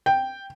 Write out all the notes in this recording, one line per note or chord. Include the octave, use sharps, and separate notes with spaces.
G5